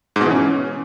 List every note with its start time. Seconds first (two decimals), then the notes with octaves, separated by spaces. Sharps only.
0.16 G#2
0.21 B2
0.26 E3
0.31 C#4